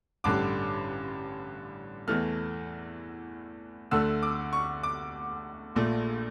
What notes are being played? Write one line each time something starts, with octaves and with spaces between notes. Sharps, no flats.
A1 G2 D3 G3 D6
E2 E3 A3 F6
D2 D3 A3 E6
D6
C#6
D6
A#1 A#2 A3